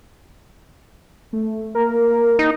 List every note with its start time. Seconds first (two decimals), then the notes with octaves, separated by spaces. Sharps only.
1.33 A3
1.75 A#3 A#4
2.39 D#4